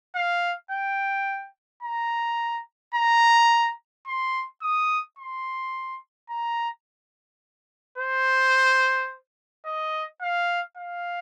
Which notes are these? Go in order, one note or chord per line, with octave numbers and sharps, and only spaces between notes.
F5
G5
A#5
A#5
C6
D#6
C6
A#5
C5
D#5
F5
F5